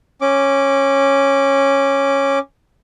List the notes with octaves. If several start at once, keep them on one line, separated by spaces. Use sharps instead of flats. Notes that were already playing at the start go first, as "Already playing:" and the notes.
C#4 D6